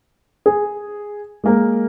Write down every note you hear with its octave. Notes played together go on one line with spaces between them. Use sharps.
G#4
G#3 A#3 A#4